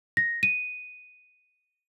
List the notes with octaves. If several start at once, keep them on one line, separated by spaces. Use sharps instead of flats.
A#6
D#7